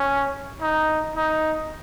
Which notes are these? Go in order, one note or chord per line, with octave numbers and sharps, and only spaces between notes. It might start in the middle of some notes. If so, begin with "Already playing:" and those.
Already playing: C#4
D#4
D#4